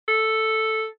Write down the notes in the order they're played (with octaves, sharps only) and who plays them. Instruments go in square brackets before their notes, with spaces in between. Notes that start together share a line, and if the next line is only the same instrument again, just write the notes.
[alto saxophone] A4